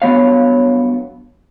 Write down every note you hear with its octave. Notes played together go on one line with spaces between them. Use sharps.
G2 F#3 G3 B3 C#5 F5